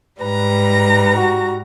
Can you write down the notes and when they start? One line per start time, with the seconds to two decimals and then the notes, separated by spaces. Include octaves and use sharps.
0.20 G#2 G3 B4 A#5
1.16 F#4